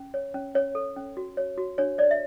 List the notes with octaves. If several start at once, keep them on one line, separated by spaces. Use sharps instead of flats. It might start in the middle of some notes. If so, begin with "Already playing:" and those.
Already playing: C#4
C#5
C#4
C#4 C#5
A4
C#4
F#4
C#5
F#4
D4 C#5
C#5 D5
E5